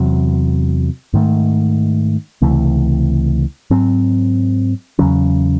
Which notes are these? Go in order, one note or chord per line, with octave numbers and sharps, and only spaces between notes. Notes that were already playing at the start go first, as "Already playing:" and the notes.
Already playing: E2 C3 F#3
G#2 D#3 A3
C#2 C3 E3 A3
G#2 F#3 C4
E2 C#3 F#3 C#4